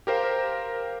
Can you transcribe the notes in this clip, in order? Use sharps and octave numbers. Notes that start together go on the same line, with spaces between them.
G4 A#4 C5 F5